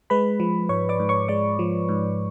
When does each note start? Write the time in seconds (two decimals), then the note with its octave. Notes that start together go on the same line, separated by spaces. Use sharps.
0.10 G#3 B4 B5
0.40 F3
0.69 G#2 C#5 C#6
0.89 D5 D6
1.00 G#2
1.09 C#5 C#6
1.28 G#3 D5 D6
1.59 F3
1.89 G#2